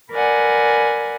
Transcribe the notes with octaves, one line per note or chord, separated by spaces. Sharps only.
A#4 B4 D5 F#5 G#5